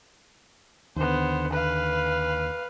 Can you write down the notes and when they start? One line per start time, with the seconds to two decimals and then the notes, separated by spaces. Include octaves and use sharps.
0.96 D#2 D3 B3 C5
1.52 B4 F5